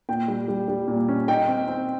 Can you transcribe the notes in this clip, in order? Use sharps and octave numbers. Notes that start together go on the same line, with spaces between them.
A#2 G5
G3
G3
G3
A#2
C#4
D#4 G5
C4
C4